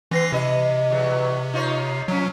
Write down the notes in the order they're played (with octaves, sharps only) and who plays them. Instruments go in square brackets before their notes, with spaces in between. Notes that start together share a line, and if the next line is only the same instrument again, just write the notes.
[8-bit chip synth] E3 A#6 C7 [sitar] B3
[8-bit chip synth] C3 [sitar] E4 D#5
[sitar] E2 F#3
D#4 F4 C#5
[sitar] F3 C#4 [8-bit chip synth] F#3